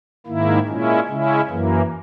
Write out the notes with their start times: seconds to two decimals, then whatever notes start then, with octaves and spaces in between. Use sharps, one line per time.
0.26 G#2 D#3 A#3 E4
0.67 A#2 G#3 C#4 E4
1.08 C#3 G#3 C#4 E4
1.49 F#2 E3 A#3